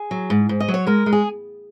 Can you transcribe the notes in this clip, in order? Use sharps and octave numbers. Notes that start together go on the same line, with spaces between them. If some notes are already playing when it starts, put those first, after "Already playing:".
Already playing: G#4
F#3
G#2
G#2
D#5
F#3
C#5
G#3 A#4
G#3
G#4